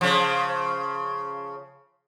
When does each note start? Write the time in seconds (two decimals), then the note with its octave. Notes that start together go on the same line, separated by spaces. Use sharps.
0.01 C#3 F3